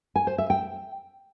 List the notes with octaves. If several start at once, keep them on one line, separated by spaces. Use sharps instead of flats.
G#5
C5
E5
G5